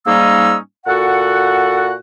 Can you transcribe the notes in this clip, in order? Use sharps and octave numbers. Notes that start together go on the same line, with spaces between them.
G#2 G3 A#3 C#4 D#4 E6
A#2 F#4 A4 F#5